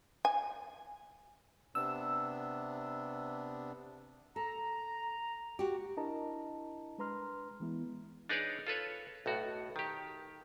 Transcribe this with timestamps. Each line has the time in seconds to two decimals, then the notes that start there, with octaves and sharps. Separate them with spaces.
0.25 G#5
1.75 C3 B3 D4 E6
4.36 A4 A#5
5.59 F#4 G4
5.97 D4 E4 A#4 D#5 A5 A#5
6.98 G#3 D4 B4 A#5 C6 F6
7.60 E3 G#3 B3 E4
8.29 D4 D#4 G#4 B4 C#5 D5
8.67 F4 A4 B4 C#5
9.26 B1 A2 F#4
9.76 D#3 G4